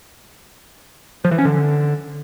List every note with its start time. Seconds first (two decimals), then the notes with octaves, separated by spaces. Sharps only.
1.25 F3
1.31 E3
1.38 C#4
1.45 D3